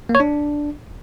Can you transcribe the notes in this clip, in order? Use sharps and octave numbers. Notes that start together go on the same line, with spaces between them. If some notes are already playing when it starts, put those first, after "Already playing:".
A#3
C#5
D4